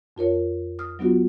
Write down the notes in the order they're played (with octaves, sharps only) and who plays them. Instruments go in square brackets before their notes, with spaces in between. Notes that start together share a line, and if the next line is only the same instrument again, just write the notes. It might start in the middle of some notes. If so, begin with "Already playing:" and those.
[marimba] F2 F4 A#4 C#5
D#6 F6
F#3 B3 D4 F4 F#4